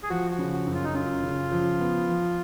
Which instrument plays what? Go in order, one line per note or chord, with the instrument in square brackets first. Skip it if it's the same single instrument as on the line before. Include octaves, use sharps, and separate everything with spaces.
[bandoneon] G#4
[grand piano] F3 [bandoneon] F#4
[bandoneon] F#4
[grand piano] C#3
[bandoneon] F#4
[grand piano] F#2
[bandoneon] F4
D#4
[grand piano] F#2 [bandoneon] F4
[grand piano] C#3
F3
B3
F3